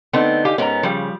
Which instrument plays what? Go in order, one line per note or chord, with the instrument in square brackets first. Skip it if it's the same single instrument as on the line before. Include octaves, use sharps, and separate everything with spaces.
[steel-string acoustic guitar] D3 D#4 [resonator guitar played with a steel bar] A3 B3 C4
[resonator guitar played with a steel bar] G4 F5 G#5
[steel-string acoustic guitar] G#2 C#4 [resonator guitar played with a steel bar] B3 A#4 A#5
[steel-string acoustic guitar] C#3 [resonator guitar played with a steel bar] F3 G3